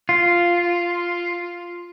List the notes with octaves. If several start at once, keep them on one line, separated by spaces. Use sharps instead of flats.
F4